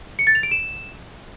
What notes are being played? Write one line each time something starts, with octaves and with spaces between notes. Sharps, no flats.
C#7
A6
F7
D7
E7